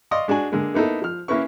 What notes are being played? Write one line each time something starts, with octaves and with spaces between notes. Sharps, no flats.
D5 D#5 F5 C6 C#6 D#6
G#3 D4 F#4 G#5
D3 G#3 A#3
A#3 B3 D#4 E4 A4
F3 F6
A#3 C#4 E4 A#4 B4 C#6